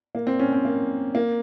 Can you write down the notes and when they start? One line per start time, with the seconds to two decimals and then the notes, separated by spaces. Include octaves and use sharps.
0.15 A#3
0.27 C4
0.39 C#4
0.53 C4
0.65 A#3
1.15 A#3